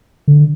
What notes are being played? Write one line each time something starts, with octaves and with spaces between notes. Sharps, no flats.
D3